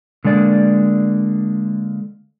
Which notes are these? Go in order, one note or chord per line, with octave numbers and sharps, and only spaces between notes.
D3 G#3 A#3 D5